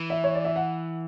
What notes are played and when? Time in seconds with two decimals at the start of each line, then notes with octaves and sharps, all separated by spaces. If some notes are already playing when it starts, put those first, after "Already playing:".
Already playing: E3
0.10 E5
0.24 C#5
0.35 D5
0.45 E5
0.56 F#5